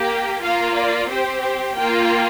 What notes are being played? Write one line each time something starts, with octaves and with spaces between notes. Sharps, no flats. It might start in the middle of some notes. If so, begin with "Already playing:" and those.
Already playing: A#3 G4
A#3 F4 F5
D5
C4 G4 C5
C5
A#3 F4 G5